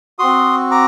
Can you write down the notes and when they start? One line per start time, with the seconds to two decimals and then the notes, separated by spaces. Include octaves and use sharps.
0.19 C4 F#4 C6 D#6
0.71 A#5 D6